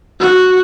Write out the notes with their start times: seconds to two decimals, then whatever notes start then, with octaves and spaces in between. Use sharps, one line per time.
0.20 F#4